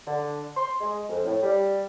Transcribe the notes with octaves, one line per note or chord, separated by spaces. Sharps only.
D3
C6
G#3
F2
A2
G3